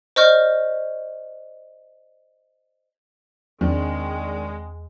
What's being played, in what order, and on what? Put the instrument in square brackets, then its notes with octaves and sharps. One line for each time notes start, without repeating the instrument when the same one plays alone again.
[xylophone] C5 D5 D#5 C#6 F6 G6
[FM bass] E2 [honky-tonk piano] D#3 D4 [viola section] G#3 [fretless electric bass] C4